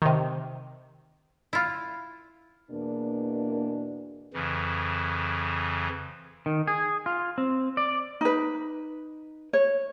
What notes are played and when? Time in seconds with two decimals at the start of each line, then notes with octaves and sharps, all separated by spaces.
0.02 C3 D#3
1.53 E4 F4
2.71 E2 B2 A#3 D4
4.34 F2 C#3 E3
6.46 D#3
6.67 G#4
7.06 F4
7.38 C4
7.77 D5
8.21 D#4 B4
9.53 C#5